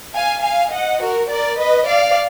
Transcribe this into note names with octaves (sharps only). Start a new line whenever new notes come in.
F5 G#5
F5 G#5
D#5 F#5
F#4 A#4
A#4 D5
B4 D#5
D5 F5